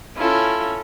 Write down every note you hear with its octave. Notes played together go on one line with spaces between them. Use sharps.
C#4 E4 F4 A4